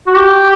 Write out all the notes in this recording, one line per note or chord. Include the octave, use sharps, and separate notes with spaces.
F#4
G4